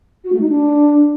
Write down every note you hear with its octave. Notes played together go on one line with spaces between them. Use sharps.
F#4
A3
D#4
D4